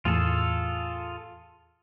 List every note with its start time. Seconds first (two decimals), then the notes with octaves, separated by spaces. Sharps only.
0.05 E2 A2 F4 G#4 A4